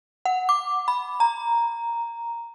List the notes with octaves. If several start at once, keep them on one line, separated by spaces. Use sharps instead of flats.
F#5
D6
B5
A#5